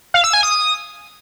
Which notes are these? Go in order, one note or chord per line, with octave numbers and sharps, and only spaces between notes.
F5
E6
G#5
D#6